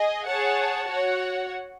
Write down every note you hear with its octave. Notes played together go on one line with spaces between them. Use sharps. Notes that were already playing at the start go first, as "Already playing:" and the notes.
Already playing: G#4 D#5
G#4 C#5 F#5 A5
F#4 C#5 F#5